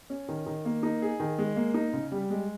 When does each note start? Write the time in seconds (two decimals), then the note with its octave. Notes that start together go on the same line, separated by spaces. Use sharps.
0.10 C#4
0.28 D#3
0.46 D#3
0.65 A#3
0.83 D#4
1.02 G#4
1.20 D#3
1.39 G#3
1.56 A#3
1.74 D#4
1.93 C#3
2.12 G3
2.30 G#3